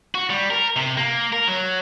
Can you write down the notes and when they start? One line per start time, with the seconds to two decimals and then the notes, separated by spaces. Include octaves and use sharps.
0.15 F#4
0.30 G3
0.50 A#4
0.76 C3
0.97 A#3
1.32 A#4
1.47 F#3